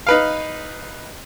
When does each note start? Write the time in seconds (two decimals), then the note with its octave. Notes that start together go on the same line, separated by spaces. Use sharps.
0.07 D#4 B4 F5